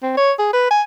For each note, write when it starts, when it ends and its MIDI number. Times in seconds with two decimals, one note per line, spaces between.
0.03 0.17 60
0.17 0.32 73
0.39 0.50 68
0.53 0.67 71
0.70 0.82 80